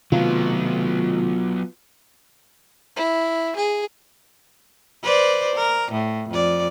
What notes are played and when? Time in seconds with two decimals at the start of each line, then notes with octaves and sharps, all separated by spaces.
0.12 C3 D#3 F#3 A3 B3 F4
2.96 E4
3.56 G#4
5.02 B4 C5 D5
5.55 A#4
5.92 A2
6.29 F2 D5